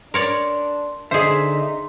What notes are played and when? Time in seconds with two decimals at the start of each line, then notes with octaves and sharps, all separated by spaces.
0.14 D4 A#4 C#5 D5 C6
1.11 D3 D#4 G#4 C5 D#5 E5 C6